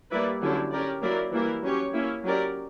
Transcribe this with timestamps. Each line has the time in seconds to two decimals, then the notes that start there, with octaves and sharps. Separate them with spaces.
0.11 G3 A#3 E4 B4 D5
0.41 D3 F#3 C#4 E4 G4
0.72 C#4 G4 A#4 D5
1.02 F#3 A#3 E4 A#4 D5
1.32 E3 G3 A#3 E4 A#4
1.63 F#3 C#4 G4 C#5
1.93 A#3 C#4 E4
2.24 F#3 C#4 G4 A#4 D5